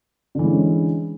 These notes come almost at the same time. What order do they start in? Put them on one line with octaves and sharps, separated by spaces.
D3 E3 G#3 C#4